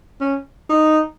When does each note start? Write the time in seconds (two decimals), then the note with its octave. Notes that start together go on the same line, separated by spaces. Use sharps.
0.21 C#4
0.69 D#4